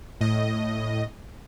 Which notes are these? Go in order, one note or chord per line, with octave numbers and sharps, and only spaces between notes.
A2 D#5